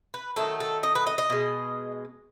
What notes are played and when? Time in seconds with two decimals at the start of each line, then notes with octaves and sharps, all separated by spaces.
0.14 B4
0.36 D#3 F#3 A3 A4
0.60 A4
0.83 D#5
0.95 B4
1.07 D#5
1.18 D#5
1.30 B2 G#3